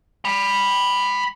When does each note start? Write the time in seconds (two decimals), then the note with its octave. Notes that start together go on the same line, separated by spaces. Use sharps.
0.25 G5 B5